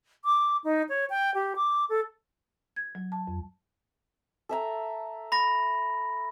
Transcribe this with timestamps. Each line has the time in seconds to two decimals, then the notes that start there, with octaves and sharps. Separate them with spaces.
0.25 D6
0.64 D#4
0.89 C#5
1.10 G5
1.35 G4
1.56 D6
1.89 A4
2.76 G#6
2.95 F#3
3.12 A5
3.27 F2
4.49 A4 E5 A#5
5.32 B5 A#6